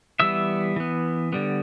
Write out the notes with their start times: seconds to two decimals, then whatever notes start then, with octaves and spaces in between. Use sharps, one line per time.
0.20 E3 G3 B3 E5 E6
0.76 E3 B3
1.33 D3 G3 B3